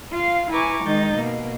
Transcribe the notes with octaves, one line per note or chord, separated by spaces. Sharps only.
F4 F5
E4 B4 G#5 A#5 C#6 D6
D#3 G#3 D#4 G6 A6
B2 A#3